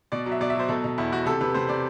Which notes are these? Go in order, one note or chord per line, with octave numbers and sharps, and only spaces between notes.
B2 D5
F#3
E5
B2 D5
E5
F#3 C5
B2 A4
B2
E2 E4
E2 F#4
C3 A4
C3 B4
C3 C5
C3 D5